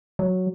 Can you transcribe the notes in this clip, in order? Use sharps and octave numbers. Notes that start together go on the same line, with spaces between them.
F#3